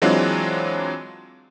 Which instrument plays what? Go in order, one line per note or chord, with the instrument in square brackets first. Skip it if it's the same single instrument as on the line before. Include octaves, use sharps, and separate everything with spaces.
[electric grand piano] E3 F#3 G#3 C4 D4 F4